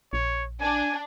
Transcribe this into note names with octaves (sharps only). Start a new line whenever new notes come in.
A#1 C#5
D4 G#5